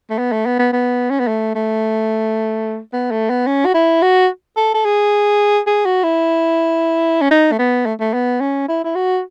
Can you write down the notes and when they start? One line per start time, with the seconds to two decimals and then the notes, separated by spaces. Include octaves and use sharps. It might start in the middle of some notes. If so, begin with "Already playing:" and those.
0.10 A3
0.18 B3
0.32 A3
0.46 B3
0.59 B3
0.73 B3
1.10 C#4
1.19 B3
1.28 A3
1.55 A3
2.93 B3
3.11 A3
3.30 B3
3.47 C#4
3.66 F#4
3.74 E4
4.02 F#4
4.57 A4
4.74 A4
4.85 G#4
5.67 G#4
5.85 F#4
6.04 E4
7.22 C#4
7.31 D#4
7.52 A3
7.59 B3
7.86 A3
8.00 A3
8.14 B3
8.40 C#4
8.68 E4
8.84 E4
8.95 F#4